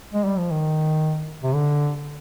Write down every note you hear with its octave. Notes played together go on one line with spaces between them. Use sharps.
G#3
G3
F3
D#3
C3
D3